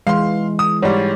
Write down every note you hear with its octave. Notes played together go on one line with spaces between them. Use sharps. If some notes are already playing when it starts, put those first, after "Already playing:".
E3 G#3 F5 C6
D#6
G#2 G3 C#5 D5